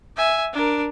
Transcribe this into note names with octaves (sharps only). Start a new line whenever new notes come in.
E5 G#5
D4 A#4